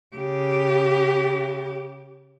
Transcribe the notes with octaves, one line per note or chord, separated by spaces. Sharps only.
C#3 G4